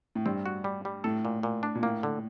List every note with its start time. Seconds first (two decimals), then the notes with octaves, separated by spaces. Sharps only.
0.15 A2
0.26 G2 C4
0.46 F#4
0.64 G3
0.85 G3
1.04 A2 A4
1.25 A#2
1.43 A#2
1.63 D4
1.75 A#2
1.82 A2 A#3
2.03 D3